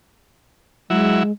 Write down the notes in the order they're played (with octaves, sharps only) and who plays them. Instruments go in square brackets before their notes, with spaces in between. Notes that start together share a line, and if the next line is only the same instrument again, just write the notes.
[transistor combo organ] F#3 E4 [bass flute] G#3